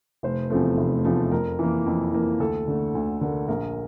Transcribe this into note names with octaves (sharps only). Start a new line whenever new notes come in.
F1 C5
E2 C3 F3 A3
F1
E2 C3 F3 A3
F2 A#4
E3 A#3
F2
E3 A#3
D2 A4
D3 A3
D2
D3 A3 A#4
A#1 A#4